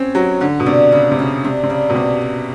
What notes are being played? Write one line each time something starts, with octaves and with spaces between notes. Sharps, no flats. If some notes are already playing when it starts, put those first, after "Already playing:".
Already playing: C4 C#4
D#3 F#3
D3 F#4
B2
C3 D4
C#3 F#4
C3
C#3 F#4
C3 D4
C3
C#3 D4
B2
C3 G3
A#3